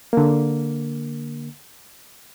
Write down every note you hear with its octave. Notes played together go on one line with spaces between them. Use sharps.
D3 A#3